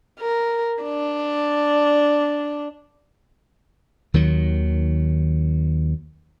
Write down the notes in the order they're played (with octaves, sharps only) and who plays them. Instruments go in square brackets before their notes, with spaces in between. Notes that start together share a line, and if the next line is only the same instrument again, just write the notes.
[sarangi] A#4
D4
[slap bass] D#2 D#3 F#3